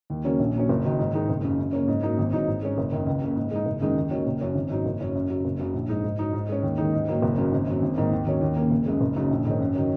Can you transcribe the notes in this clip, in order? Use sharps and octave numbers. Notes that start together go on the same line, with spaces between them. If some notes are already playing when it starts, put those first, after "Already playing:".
D#2
C#3 F#3 A#3 C#4
A#1
A#2 F#3 C#4
F#1
F#2 D#3 F#3
G#2
D#3 G#3 D#4
F#1
F#2 C#3
F#2
C#3 A#3 C#4
G#2
F#3 A#3 D#4
G#1
G#2 F#3 D#4
G#2
G#3 C#4
F#1
F#2 D#3
C#2
C#3 A#3
G#2
G#3 D#4
F#1
F#2 D#3 G#3 D#4
D#2
D#3 F#3 C#4
F#1
F#2 F#3 C#4
G#1
G#2 F#3 D#4
F#1
F#2 F#3 C#4
F#2
C#3 F#3
F#1
F#2 C#3 F#3
A#1
G#2 G#3 D#4
G#2
F#3 D#4
G#2
G#3 C#4
D#2
D#3 G#3 D#4
G#2
D#3 F#3 A#3
F#1
F#2 F#3 A#3
G#1
F#2 F#3
G#1
G#2 D#3 A#3
D#2
D#3 F#3 C#4
D#2
C#3 A#3
F#1
F#2 C#3 G#3
F#1
F#2 C#3 F#3 D#4
A#1
G#2 D#3 G#3 C#4
F#2
D#3 F#3 C#4